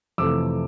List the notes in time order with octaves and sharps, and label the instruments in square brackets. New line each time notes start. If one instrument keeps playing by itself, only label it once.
[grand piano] F2 C3 E3 A3 D6 E6